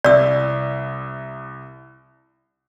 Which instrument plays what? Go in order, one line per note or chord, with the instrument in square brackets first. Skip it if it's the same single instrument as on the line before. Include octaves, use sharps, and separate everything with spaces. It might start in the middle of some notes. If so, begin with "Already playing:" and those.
[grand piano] C2 E4 [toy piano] D5 E6